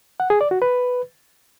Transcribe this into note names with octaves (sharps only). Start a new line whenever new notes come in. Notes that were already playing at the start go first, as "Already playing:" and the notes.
F#5
G#4
D5
F#4
B4